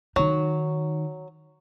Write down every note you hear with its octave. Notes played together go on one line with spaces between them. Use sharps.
D#3 F#3 D#4